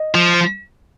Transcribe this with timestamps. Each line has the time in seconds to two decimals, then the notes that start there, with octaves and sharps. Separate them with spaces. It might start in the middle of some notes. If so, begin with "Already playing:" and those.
Already playing: D#5
0.15 F3